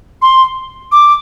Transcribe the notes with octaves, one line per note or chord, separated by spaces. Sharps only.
C6
D6